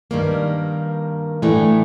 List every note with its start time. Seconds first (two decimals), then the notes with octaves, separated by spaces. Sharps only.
0.11 G2 D#3 G3 A#3
1.42 A2 E3 A3 D4